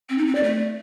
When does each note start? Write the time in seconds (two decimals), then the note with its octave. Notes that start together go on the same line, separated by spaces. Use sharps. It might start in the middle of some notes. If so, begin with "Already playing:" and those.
0.09 C4
0.18 D#4
0.27 C4
0.35 D5
0.44 A3